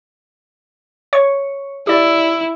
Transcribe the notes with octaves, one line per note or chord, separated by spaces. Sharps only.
C#5 C#6 C#7
E4 G4 D5